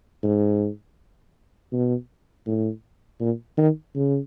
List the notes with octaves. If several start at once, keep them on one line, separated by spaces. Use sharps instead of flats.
G#2
B2
A2
A#2
D#3
C#3